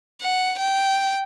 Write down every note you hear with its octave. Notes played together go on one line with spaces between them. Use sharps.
F#5
G5